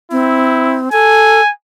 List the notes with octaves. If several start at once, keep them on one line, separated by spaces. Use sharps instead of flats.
C4 E4
A4 G#5